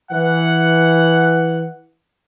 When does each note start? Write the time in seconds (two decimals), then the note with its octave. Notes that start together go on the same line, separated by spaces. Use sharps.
0.11 E3 F#5